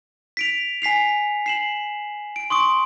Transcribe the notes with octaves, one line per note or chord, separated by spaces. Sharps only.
B6 D7 F7
G#5 B6 C7 F7
C7 E7 F#7
D7
C6 C#6 D#6 D7